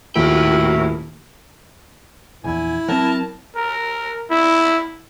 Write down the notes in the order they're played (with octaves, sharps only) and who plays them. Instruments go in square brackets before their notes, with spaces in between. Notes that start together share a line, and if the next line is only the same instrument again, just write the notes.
[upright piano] D#1 [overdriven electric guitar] A2 G5 [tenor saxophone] E4 [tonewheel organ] F#4 A#4
[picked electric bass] A#1 E2 [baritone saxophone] E4 [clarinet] G#5
[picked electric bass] F#3 C4 [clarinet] A#4 [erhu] A5
[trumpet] A#4
E4